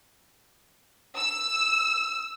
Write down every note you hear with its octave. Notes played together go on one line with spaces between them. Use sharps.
E6